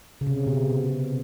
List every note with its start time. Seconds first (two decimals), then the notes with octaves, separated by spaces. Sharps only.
0.21 C#3
0.27 C3
0.47 B2